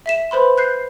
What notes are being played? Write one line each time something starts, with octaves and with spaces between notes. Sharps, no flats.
E5 B6 E7
B4 C5 B5 C6
F#6 G6 C7